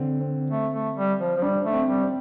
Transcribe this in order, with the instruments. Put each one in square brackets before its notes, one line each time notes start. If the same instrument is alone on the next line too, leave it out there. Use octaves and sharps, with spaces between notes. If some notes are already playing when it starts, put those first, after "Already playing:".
Already playing: [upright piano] D3 C4
C4
[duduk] A3
A3
G3
F3
F3
[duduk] G3 [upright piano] D4
[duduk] A3
[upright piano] C4
[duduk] G3
[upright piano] C4